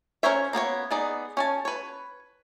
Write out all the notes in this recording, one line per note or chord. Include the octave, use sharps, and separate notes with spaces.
C#4 A#4 C5 C#5 E5
A#3 B3 B4 C#5
B3 D#4 G#4 D5
C#4 G#5 A5
B4 C#5